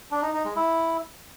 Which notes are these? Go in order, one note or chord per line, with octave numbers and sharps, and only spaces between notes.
D4
D#4
D#4
G#3
E4